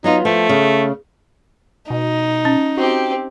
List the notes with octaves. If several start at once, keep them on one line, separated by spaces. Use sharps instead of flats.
F#3 B3 D#4 F4
F3 A3
C#3
B2 D#4
C#4
C4 F#4 G4